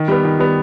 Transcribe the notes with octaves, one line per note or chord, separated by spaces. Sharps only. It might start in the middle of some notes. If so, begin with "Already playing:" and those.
Already playing: D#3
G3 B3
D#3
G3 B3